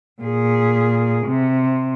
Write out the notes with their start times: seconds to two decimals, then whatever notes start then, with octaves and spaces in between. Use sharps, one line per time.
0.22 A#2 G#4
1.26 C3